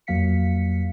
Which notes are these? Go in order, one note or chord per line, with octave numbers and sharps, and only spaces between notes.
F2 F#3 A#3 F5 B6 C#7